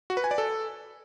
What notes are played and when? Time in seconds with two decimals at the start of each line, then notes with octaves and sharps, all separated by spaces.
0.10 F#4
0.17 B4
0.24 G#5
0.31 D5
0.38 A4